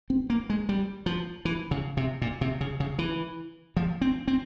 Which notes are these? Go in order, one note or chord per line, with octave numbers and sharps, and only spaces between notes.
C4
A#3
G#3
G3
F3
E3
C#3
C3
A#2
C3
C#3
C#3
E3
F3
C4
C4